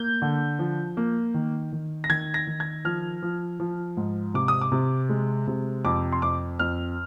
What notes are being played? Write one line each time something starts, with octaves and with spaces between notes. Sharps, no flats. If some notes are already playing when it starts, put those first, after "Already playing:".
Already playing: A#3 G6
D3
F3
A#3
D#3
D#3
A#6
D#3 G#6
A#6
D#3
G#6
F3 F6
F3
F3
G#2
C3 D6
D#6
D6
C3
G#3
C3
F2 D6
C6
F2 D6
F2 F6